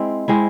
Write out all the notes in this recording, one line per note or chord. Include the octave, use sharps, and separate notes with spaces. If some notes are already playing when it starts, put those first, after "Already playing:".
Already playing: G#3 C4 E4
G#3 C4 E4